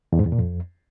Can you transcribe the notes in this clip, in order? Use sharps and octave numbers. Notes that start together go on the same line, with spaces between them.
E2
G#2
E2
A#2
F2